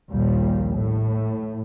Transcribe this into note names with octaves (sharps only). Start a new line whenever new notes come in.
A#1 D#2 A#2 G3
A2